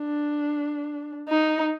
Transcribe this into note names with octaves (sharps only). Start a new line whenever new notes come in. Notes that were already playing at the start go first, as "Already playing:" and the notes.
Already playing: D4
D#4